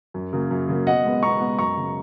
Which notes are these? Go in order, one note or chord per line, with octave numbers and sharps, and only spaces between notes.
F#2
C#3 F#3 A#3
F#2
C#3 F#3 A#3
B2 D#5 F#5
G#3 B3
B2 A#5 C#6
G#3 B3
F#2 A#5 C#6
C#3 G#3